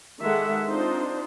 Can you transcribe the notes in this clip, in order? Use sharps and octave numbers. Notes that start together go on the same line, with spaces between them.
D#3 G#3 G4 A4 E5 F#5
C4 D4 D#4 F4 C5